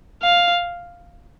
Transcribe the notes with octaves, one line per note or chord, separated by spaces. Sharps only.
F5